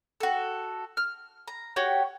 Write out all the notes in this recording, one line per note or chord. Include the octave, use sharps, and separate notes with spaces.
F#4 A4
F6
A#5
F#4 G4 C#5